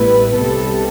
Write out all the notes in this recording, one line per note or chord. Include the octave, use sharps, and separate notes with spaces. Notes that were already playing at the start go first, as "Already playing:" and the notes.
Already playing: A1 A2 G3 B3 E4 B4
C2 C3 G3 B3 A4